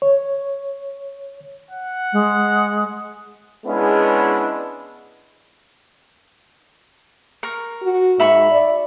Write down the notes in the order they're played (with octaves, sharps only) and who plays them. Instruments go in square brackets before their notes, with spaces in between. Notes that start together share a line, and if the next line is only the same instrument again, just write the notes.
[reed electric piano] C#5
[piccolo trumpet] F#5
[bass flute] G#3
[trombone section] G#3 B3 C#4 D4 E4 G#4
[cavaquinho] A#4 C#6
[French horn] F#4
[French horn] G#2 [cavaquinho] E5 B5 C#6
[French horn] D5